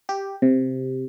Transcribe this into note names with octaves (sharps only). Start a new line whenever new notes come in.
G4
C3